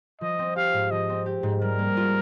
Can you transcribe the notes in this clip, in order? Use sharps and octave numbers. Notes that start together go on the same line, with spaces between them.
F3 D#5
C4
G4 F5
G#2
F3 D#5
C4
G4
G#2
G3 A#4
A#3
F4